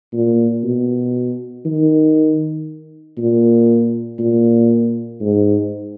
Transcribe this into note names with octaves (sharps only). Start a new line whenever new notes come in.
A#2
B2
D#3
A#2
A#2
G#2